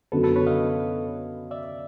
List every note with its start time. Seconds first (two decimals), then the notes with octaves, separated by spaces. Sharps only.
0.12 F#2 D3 F#3 B3 A4 B4
0.23 A4 B4
0.36 B4 C#5
0.46 D#5 F5
1.51 D5 E5